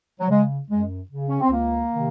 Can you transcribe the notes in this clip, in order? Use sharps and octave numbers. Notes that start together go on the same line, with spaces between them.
F#3
C#3 G#3
F#2 G#3
C#3
C#4
C4
C#2 A#3
C3 D#3